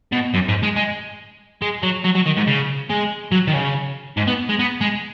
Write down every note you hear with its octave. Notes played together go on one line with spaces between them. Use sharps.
B2
F#2
G#2
G#3
G#3
G#3
F#3
F#3
F#3
D#3
G#2
C#3
G#3
F#3
D#3
C#3
G#2
B3
G#3
B3
G#3